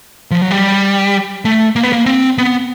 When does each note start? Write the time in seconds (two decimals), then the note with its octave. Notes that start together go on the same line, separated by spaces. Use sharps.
0.31 F3
0.42 F#3
0.51 G3
1.45 A3
1.76 A#3
1.83 B3
1.93 A#3
2.06 C4
2.38 B3